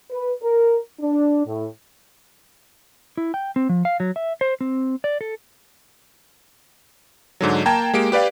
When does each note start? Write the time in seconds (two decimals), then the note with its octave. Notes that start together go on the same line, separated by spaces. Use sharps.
0.11 B4
0.42 A#4
1.00 D4
1.46 A2
3.17 E4
3.34 G5
3.56 C4
3.69 F3
3.85 F5
4.00 F#3
4.16 E5
4.41 C5
4.61 C4
5.04 D5
5.21 A4
7.41 G#2 D3 F#3
7.66 A#3 G5 A5 A#5 G#6 E7
7.94 G#3 A#3 G4 D7
8.12 G4 B4 D5 F5 G5